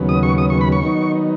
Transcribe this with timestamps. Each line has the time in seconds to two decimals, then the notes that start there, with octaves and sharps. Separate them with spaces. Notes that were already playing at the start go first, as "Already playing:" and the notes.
Already playing: D#2 C#3 F#3 B3
0.09 D#6
0.23 C#6
0.38 D#6
0.50 C#6
0.61 B5
0.72 C#6
0.83 D#3 F#3 B3 D#4